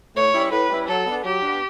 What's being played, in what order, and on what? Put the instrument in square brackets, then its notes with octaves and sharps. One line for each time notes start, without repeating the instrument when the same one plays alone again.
[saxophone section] A2 [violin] C#5
[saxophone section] G3 C#4 E4
[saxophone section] A2 [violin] B4
[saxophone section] G3 C#4 E4
[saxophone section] F#3 [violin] A4
[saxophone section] B3
D4
[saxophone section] F#3 [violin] G4
[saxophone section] B3 D4